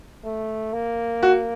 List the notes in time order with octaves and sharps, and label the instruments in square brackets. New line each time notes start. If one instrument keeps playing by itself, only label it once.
[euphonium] A3
A#3
[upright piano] F#4